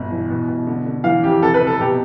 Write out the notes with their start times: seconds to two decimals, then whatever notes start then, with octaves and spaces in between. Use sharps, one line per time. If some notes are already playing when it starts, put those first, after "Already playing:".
Already playing: G1 B2
0.11 E3
0.30 B2
0.48 B2
0.67 D3
0.86 D3
1.04 E3 F5
1.23 F2 G4
1.42 C3 A4
1.54 B4
1.60 C3
1.67 A4
1.79 B2 G4